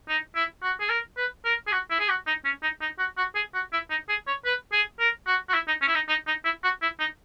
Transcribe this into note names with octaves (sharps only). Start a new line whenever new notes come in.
D#4
E4
F#4
G#4
A#4
B4
A#4
G#4
F#4
E4
G#4
F#4
D#4
C#4
D#4
D#4
F#4
F#4
G#4
F#4
E4
D#4
G#4
C#5
B4
G#4
A#4
F#4
F#4
E4
D#4
C#4
E4
D#4
D#4
D#4
E4
F#4
E4
D#4